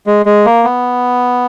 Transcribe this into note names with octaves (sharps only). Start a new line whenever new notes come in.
G#3
G#3
A#3
B3